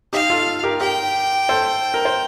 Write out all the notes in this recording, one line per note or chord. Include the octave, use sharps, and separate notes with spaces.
D#4 G4 F5
F4 A4
G4 A#4
G4 A#4 G5
A4 C5
A#4
C5